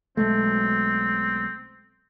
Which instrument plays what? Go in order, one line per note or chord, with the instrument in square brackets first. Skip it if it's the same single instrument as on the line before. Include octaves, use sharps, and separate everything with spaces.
[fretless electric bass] B1 G#3 A3 [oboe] C4